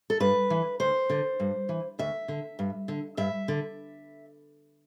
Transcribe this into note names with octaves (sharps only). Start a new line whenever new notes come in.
A4
G2 B4
E3
D2 C5
D3
G2
E3
D2 E5
D3
G2
D3
G2 E5
D3